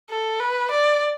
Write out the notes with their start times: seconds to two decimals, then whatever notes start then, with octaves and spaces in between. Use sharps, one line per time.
0.10 A4
0.40 B4
0.71 D5